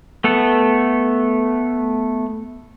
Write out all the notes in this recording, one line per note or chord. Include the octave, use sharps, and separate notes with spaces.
A3 B3 A4